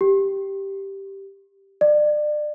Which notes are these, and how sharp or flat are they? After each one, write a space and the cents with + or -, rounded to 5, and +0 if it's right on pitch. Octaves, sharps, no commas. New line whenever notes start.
G4 -5
D5 +30